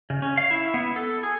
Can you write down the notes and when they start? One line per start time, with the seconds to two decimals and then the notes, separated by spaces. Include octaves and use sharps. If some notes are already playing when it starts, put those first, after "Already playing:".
0.10 C#3
0.22 C#4
0.37 F5
0.51 E4
0.74 B3
0.96 A4
1.23 G#4